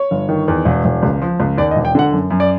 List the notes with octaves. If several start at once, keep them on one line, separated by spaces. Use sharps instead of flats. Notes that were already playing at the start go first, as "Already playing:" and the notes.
Already playing: C#5
G1
D#3
E2
E1
E1
C#2
F3
C#2
D#2 D5
D#5
E1
G5
D3 F#5
F#2
F#2
D5